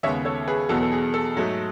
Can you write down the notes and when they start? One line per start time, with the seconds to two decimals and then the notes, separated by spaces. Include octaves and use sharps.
0.03 D#2 C#3 G#3 B3 C#5 E5
0.25 A4 C#5
0.47 G#4 B4
0.69 E2 B2 F#3 B3 A4
0.82 A4
0.92 G#4
1.14 A4
1.36 G#2 F#3 A3